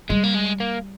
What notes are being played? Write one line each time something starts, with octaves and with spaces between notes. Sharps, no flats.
G3 G#3
A#3
G#3
A#3